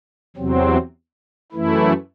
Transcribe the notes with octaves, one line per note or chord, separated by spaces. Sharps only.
E2 C3 F#3 C4
F#2 E3 A3 E4